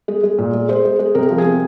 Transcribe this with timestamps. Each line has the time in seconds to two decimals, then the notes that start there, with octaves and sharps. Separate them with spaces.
0.08 G#3
0.23 G#3
0.39 A#2
0.54 G#3
0.69 G#3 C5
0.85 G#3
0.99 G#3
1.15 C3 A#4
1.30 F3
1.38 G#4
1.45 C3